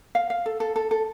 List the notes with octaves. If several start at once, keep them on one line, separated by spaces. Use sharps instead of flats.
F5
F5
A4
A4
A4
A4